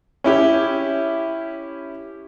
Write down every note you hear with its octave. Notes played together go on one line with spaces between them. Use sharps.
C#4 E4 G4